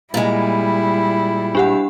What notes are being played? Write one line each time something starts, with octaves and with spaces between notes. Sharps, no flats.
A#2 G3 G#3 E4
D4 G4 F#5